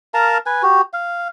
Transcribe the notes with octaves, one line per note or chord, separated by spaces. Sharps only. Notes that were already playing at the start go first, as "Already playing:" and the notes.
A#4 F5 A5 A#5
B4 G#5
F#4 G4
F5